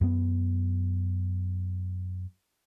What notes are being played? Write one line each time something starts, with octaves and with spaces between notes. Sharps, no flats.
F#2 B3